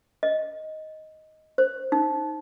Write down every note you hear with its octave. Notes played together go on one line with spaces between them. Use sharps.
D#5
C5
D#4